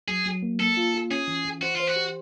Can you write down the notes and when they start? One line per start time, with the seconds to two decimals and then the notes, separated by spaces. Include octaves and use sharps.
0.08 F#3 G#4
0.26 F#3
0.42 A#3
0.59 A#3 A4
0.77 F4
0.94 F4
1.11 C#4 G#4
1.28 E3
1.45 E3
1.62 F#4 C5
1.76 F4 C5
1.87 F#4
1.96 G4